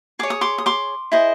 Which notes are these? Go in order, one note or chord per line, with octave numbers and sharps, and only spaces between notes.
G#4 C#5 D6
D#6
C6 D6
D#6
C6 D6
E4 G#4 C5 D#5